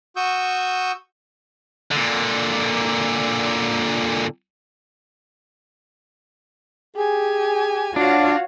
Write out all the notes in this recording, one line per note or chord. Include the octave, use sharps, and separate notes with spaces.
F#4 C#6 D#6 E6 G6
A#2 D3
G4 G#4 G#5
D4 F4 F#4 C#5 F5 F#5